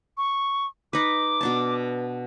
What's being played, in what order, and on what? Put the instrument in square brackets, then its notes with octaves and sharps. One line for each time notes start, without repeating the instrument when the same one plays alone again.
[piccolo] C#6
[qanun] D#4 B4 [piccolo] D6
[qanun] B2 D4 A5